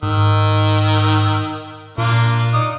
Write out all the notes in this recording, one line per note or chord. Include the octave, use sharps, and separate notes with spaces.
G#2 D#3 E6
A#2 A#3 D4 F4
D#4 D5 D#6